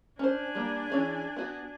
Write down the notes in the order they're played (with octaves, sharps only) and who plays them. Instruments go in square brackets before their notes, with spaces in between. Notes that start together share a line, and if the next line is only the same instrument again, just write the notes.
[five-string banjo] C#4 C5 [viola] D4 G#5
[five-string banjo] G3 A#3
E3 C#4 G#4
B3 F#4